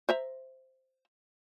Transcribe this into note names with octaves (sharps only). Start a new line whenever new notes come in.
C5 E5 A#5